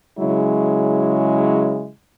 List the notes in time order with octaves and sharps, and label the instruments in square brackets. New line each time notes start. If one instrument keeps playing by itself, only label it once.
[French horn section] C#3 F#3 G#3 E4